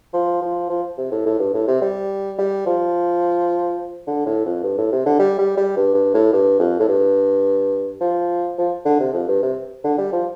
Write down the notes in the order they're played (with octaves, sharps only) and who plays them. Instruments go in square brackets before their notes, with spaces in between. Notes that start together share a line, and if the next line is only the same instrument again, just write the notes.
[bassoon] F3
F3
F3
C3
A2
A2
G2
A2
C3
G3
G3
F3
D3
A2
F2
G2
A2
C3
D3
G3
G3
G3
G2
G2
A2
G2
F2
A2
G2
F3
F3
D3
C3
F2
G2
C3
D3
G3
F3